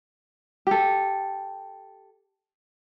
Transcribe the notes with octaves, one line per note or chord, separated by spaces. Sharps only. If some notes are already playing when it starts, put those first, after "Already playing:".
G4 A4